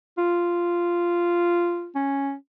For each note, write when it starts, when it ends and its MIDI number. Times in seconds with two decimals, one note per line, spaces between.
0.18 1.90 65
1.95 2.34 61